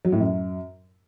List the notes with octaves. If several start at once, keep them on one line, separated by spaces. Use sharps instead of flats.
F#3
A2
F#2